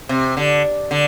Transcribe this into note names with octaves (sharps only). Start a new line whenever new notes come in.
C3
D3
D3